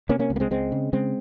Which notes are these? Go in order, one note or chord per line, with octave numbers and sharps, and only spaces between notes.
C3 A#3 C#4
A#3 C#4
C#2
A#3
G#3 C4
C#2 G#3 C4
C#3
C#3 G#3 C4